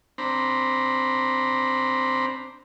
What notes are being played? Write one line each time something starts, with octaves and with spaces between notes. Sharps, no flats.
C4 D4 C5 A#5 B5